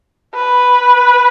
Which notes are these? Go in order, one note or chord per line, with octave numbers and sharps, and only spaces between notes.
B4